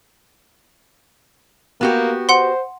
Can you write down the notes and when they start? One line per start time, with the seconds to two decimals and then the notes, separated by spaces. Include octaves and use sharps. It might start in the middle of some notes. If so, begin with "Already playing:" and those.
1.81 A#3 B3 F#4 G4
2.29 C5 F#5 C6